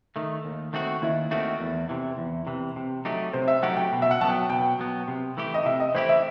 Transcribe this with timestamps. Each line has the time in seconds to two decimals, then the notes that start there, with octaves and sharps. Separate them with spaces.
0.16 D#3 A3
0.45 D#2
0.73 D#3 A3 C4 F#4
1.02 D#2 E4
1.31 D#3 A3 C4 F#4
1.60 E2
1.89 C3 E3
2.18 E2
2.47 C3 E3
2.76 C3
3.05 F#3 A3 D#4 G4
3.33 C3 C5
3.48 E5
3.62 F#3 A3 D#4 G4 F#5
3.77 G5
3.92 B2
4.02 E5
4.11 F#5
4.21 F#3 B3 A5
4.30 G5
4.50 B2 G5
4.79 F#3 B3
5.08 C3
5.37 E3 A3 E4 G4
5.54 D#5
5.65 C3 E5
5.80 D#5
5.95 E3 A3 E4 G4 C5
6.09 E5